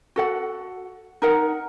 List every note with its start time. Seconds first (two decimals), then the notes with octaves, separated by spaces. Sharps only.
0.16 F#4 A4 F#5
1.22 D#4 A#4 F#5